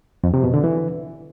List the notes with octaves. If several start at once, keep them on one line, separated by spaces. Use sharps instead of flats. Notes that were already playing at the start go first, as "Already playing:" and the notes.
F2
C3
B2
D3
E3